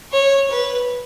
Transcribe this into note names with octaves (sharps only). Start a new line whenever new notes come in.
C#5
B4